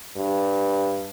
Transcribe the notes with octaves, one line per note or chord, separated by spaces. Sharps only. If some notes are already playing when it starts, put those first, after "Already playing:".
G2